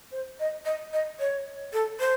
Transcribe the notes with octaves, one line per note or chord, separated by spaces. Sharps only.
C5
D#5
D#5
D#5
C#5
A4
C5